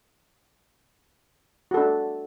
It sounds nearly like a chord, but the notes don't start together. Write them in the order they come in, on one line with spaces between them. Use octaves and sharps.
F#4 A4 D4